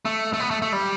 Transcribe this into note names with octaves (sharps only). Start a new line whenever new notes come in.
A3
A3
B3
A3
A3
G3